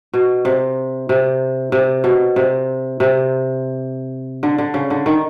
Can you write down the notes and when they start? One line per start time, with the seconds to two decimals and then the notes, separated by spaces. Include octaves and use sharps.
0.14 B2
0.45 C3
1.09 C3
1.72 C3
2.04 B2
2.36 C3
3.00 C3
4.43 D3
4.58 D3
4.74 C#3
4.90 D3
5.06 D#3